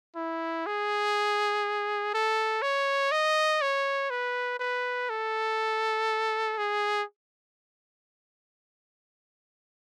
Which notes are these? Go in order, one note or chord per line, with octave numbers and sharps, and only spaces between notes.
E4
G#4
A4
C#5
D#5
C#5
B4
B4
A4
G#4